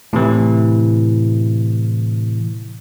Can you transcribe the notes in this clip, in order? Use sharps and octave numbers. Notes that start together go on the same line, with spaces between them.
A2 C3 E3